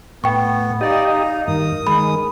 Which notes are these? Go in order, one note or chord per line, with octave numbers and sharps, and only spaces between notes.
A2 B3 G5 C#6
D#4 G4 D5 D#5 F5
D#4
G2 D#3 A#4 D#6
D#3 G#3 B5